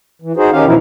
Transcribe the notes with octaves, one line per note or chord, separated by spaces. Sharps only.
E3
D#4 F#4 G#4 C5
D#3 C#4 D#4 G4 F5
B2 E3 F3 D#4 E4